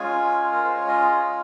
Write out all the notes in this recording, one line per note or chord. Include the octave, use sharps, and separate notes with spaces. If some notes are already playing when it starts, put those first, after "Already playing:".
Already playing: G#3 C#4 F4 G#5
A#4
C5
C#5
D#5
D#5